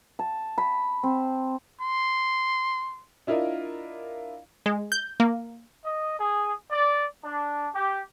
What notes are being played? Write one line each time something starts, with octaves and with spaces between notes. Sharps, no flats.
A5
B5
C4
C6
D4 E4 F4 A#4 D#5
G#3
G6
A#3
D#5
G#4
D5
D4
G4